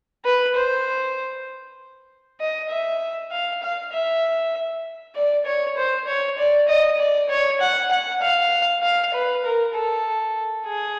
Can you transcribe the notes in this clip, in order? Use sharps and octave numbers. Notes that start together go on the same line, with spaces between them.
B4
C5
D#5
E5
F5
F5
E5
D5
C#5
C5
C#5
D5
D#5
D5
C#5
F#5
F#5
F5
F5
B4
A#4
A4
G#4